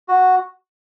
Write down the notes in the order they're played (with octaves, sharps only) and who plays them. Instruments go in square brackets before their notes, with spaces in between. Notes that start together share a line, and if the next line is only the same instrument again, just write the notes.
[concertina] F#4